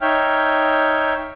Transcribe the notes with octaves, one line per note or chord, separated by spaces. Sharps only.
D#4 C#5 E5 G5 F6